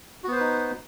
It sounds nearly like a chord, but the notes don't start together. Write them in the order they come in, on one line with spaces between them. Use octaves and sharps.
F#4 B3 C5 B4 D#4